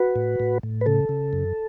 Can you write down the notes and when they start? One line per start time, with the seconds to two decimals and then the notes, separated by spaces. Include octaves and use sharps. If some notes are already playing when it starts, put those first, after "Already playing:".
Already playing: F#4 B4
0.16 A2
0.40 A2
0.63 A2
0.81 B4
0.86 C#3 A4
1.09 C#3
1.33 F#2